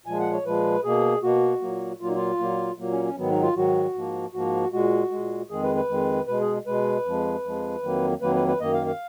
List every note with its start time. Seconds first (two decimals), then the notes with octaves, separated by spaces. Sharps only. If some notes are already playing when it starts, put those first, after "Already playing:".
0.06 A#2 F3 G#3 G#5
0.20 F#5
0.33 C#5
0.45 A#2 F3 G#3 B4
0.84 B2 A#3 G#4
1.23 B2 A#3 F#4
1.61 A#2 F#3 A#3
2.01 A#2 F#3 A#3 F4
2.08 D#4
2.15 F4
2.39 A#2 F#3 A#3
2.78 A#2 F#3 A#3
2.91 C#4
3.04 C#4
3.17 G#2 D#3 F#3 B3
3.30 D#4
3.42 F4
3.55 G#2 D#3 F#3 F#4
3.94 G#2 F3 A#3
4.33 G#2 F3 A#3 F#4
4.72 A#2 G#3 F#4
5.11 A#2 G#3
5.50 F2 D#3 G#3 G#4
5.63 B4
5.75 B4
5.89 F2 D#3 G#3
6.27 B2 G#3 B4
6.41 G#4
6.66 B2 G#3 B4
7.05 F2 F3 G#3
7.44 F2 F3 G#3
7.83 F2 D#3 F#3 A#3
8.21 F2 D#3 F#3 A#3 B4
8.35 B4
8.47 B4
8.60 F#2 D#3 A#3 D#5
8.73 F5
8.86 F5